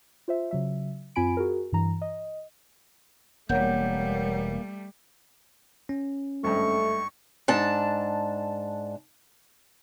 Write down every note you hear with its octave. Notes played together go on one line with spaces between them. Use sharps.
F4 C5 E5
C#3 F#3 E5
F#2 C4 F4 G#5 B5 D7
F#4 G#4 A#4
G2 E3 A#5
D#5
E1 G3 A3 A#3 C#5 F#5 G6
C#4
G#1 G2 A3 C#6
G#2 D4 A5